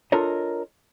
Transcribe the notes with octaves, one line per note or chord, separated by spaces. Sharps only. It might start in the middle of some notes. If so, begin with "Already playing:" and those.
D4 F4 A4 A#4 C#5 D#5